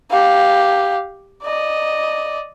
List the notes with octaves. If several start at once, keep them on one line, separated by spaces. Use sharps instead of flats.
G4 F5
D5 D#5